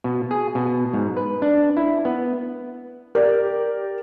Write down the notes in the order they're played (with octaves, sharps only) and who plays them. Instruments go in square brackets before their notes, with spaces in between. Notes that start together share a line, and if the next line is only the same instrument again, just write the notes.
[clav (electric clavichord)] B2
G#4
B2
G#2
B4
D4
E4
B3
[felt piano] G4 A#4 D5